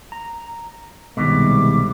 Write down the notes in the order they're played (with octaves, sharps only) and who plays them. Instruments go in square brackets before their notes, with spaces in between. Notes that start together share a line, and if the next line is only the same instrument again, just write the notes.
[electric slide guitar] A#5
[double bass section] C2 [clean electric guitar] B2 [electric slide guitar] D#3 G#3 [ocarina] D6